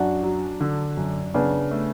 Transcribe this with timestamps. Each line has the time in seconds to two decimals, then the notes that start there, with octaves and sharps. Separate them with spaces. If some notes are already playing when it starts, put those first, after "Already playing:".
Already playing: F#2 D4 F#4
0.23 F#3
0.61 D3
0.97 F#2
1.34 C#3 B3 D4
1.71 A3